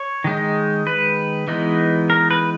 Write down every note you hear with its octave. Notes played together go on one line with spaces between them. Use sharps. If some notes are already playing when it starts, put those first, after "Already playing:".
Already playing: C#5
D#3 G#3 D#4
B4
E3 G#3 B3 D#4
A#4
B4